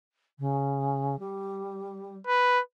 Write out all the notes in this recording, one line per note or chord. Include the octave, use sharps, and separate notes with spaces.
C#3
G3
B4